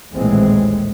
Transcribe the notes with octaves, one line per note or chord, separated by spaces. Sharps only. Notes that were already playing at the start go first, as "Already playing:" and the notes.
A#1 D#2 A2 E3 G#3 C4